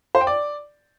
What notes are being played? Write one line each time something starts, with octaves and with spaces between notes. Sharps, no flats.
C5
G5
D5